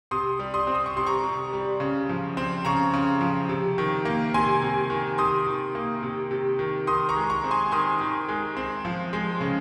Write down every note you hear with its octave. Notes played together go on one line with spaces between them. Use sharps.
C3 C6 D#6
G3
C6 D#6
C4
D#6
C#6
C3 C6
A#5 C#6
C3
G3
C#3
F3
C4
C#3 A#5 C#6
C#3
F3
C3
D#3
A#3
C3 G#5 C6
C3
D#3
C3 C6 D#6
D#3
A#3
C3
C3
D#3
D#3 C6 D#6
A#5 C#6
G#3
A#5 C#6
C4
G#5 C6
D#3 C6 D#6
D#3
G#3
C4
F3
G#3
C#3